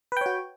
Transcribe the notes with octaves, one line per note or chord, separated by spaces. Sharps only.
F#4 B4 C#5 G5